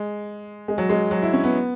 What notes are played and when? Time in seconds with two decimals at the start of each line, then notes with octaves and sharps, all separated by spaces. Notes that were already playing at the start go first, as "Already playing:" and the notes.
Already playing: G#3
0.68 G#3
0.78 F#3
0.89 G#3
1.11 F#3
1.23 E4
1.33 C#4
1.43 B3